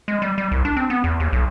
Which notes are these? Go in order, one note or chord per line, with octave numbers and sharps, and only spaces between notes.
G#3
G3
G3
C2
D4
C4
B3
E2
D#2
B1